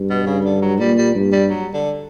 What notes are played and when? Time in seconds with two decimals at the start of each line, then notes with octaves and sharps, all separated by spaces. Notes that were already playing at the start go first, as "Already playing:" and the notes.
Already playing: G2
0.10 B2
0.26 C#3
0.45 D3
0.62 F#3
0.80 A#2 G3
0.98 G3
1.15 G2
1.32 G3
1.50 F#3
1.73 D3